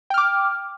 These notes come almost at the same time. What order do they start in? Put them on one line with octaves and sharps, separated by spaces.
G5 F6 D6